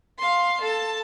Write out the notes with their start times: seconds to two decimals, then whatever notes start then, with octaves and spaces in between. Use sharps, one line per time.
0.18 F5 C6
0.61 A4 A5